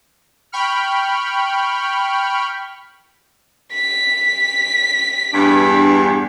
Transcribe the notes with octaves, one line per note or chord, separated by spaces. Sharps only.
G5 B5 C#6 F6
B6
E2 G2 D4